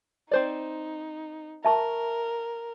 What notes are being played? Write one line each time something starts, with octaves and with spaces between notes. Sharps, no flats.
C4 D#4 C5 D5
A#4 E5 A5 C#6